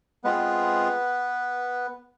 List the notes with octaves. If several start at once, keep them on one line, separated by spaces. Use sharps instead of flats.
G#3 B3 C4 F4 G#4 B4